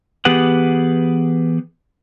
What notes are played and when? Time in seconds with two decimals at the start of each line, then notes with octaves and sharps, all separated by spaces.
0.25 E3 B3 G4 G#4 B4 F#5